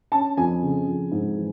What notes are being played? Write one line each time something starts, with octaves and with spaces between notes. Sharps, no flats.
C#4 A5
F2 G#5
C#3
F2
G#2
E3